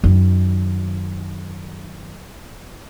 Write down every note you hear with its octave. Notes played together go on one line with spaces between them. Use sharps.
F#2 D#3